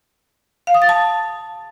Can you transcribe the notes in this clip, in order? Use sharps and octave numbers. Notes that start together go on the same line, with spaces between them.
F5
D#6
A6
A5